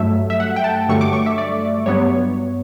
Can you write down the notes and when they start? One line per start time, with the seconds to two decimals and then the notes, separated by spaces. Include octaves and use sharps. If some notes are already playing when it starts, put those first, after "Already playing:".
Already playing: G2 F#3 A3 E5
0.30 E5
0.40 F#5
0.56 G5
0.64 A5
0.89 G2 D3 F#3 A3 C#6
1.01 D6
1.13 C#6
1.26 E5
1.38 D5
1.86 G2 F#3 B3 C#5